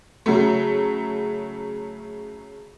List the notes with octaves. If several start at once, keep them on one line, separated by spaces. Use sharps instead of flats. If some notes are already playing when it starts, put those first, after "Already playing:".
C#3 F#3 A3